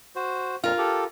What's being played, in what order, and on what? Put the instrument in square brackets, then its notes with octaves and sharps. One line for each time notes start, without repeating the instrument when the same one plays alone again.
[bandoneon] F#4 C5
[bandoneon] F2 A#2 [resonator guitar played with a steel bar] F4 A#4
[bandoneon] G4 A4